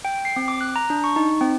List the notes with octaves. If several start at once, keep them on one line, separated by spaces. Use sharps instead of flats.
G5
C7
C4
D6
F#6
A#5
D4
C#6
D#4
C4